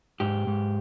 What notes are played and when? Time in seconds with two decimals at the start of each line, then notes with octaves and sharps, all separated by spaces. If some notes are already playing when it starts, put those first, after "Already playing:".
0.20 G#2 G4
0.47 G#2